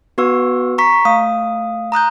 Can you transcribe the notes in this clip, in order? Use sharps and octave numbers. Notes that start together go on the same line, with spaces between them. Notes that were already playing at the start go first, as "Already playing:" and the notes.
B3 F#4 B4 C#6 E6
A#5 C#6 B6
A3 F5 D#6
A#5 D#6 F#6 G6